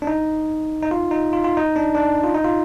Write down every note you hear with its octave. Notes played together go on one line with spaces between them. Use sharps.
D4
D#4
D#4
F4
D#4
F4
F4
D#4
D4
D4
F4
D#4
F4